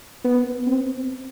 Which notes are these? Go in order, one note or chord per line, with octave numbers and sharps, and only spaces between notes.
B3
C4